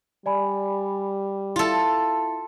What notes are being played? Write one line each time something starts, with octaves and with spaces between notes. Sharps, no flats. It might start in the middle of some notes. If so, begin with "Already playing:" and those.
G3 D5 G#5 B5
E4 F4 A4 E5